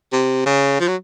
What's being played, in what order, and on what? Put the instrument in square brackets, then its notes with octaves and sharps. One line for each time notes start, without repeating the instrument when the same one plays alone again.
[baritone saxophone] C3
C#3
F3
F#3